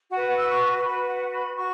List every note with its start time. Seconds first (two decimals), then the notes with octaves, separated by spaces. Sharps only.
0.11 F#4 B4 F#5
0.37 E6
0.48 C#6
0.77 C#6
0.84 F#4 B4 B5
1.08 F#5
1.33 B5
1.57 F#4 C#6